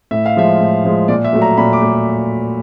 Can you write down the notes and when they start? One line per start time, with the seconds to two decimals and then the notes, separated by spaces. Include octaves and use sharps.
0.11 A2 E5
0.26 F5
0.36 F3 G#3 E5
0.60 A2
0.85 F3 G#3
1.08 A#2 D5
1.24 E5
1.33 F#3 A3
1.42 A#5
1.57 A#2 B5
1.73 D6
1.81 A3